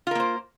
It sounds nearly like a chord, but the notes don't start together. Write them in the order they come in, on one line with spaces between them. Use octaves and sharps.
F4 A#4 A#3 C5